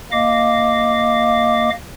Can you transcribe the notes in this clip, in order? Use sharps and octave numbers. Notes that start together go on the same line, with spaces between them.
A#3 D#5 F5 D6